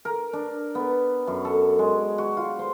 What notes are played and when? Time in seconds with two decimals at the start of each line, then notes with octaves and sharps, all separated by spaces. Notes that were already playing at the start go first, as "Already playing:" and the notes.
0.05 A#4
0.33 D4
0.75 B3
1.27 F#2
1.45 A4
1.79 G#3
2.18 F#4
2.37 F4
2.59 C5